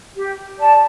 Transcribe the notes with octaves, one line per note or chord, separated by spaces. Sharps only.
G4
D5 A5